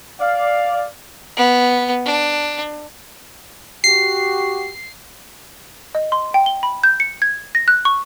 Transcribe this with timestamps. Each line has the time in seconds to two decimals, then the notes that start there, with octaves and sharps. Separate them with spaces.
0.21 D5 F5
1.37 B3
2.05 D4
3.84 F#4 G4 C7
5.95 D#5
6.12 C6
6.34 G5
6.46 G7
6.63 B5
6.84 G6
7.00 C#7
7.22 G#6
7.55 A#6
7.68 F#6
7.85 C#6